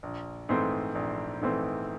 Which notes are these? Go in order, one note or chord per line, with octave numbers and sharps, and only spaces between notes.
A#1
G#2 E3 A3 C4
A#1
G#2 E3 A3 C4